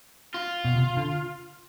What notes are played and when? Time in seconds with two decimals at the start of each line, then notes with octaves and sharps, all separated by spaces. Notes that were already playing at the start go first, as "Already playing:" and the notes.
0.34 F4
0.65 B2
0.76 C3
0.97 D3